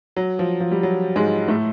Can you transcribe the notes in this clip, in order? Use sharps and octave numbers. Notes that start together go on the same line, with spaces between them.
F#3
F3
F3
G3
F#3
G#2 G#3
A2 A3